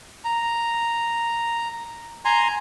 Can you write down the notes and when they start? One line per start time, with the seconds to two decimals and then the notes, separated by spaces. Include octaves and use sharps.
0.25 A#5
2.25 G#5 A#5 C6